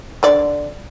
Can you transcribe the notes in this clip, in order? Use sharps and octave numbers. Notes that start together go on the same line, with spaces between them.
D3 D5